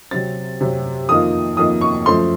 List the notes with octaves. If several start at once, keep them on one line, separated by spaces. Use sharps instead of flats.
C3 F#3 C4 A6
C3 F#3 C4
F2 D#3 A#3 F4 D#6
F2 D#3 A#3 F4 D#6
C#6
F#2 F3 A3 C6